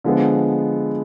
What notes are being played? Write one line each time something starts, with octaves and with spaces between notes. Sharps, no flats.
D3 F3 G#3 B3